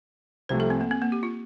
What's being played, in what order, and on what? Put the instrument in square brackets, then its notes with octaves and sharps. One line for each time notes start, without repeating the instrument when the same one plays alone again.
[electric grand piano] C2 C3 F3 A3 [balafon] C5
[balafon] A4
C4
A#3
C4
A#3
G4
F4